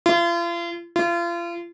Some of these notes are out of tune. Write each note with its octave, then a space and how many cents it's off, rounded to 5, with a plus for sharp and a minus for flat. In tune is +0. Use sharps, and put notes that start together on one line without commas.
F4 -40
F4 -35